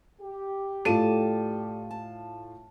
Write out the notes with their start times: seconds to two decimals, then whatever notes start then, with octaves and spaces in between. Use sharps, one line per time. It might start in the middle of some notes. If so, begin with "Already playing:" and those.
0.21 G4
0.85 A2 F4 A4 D5 A5 D#7
1.91 A5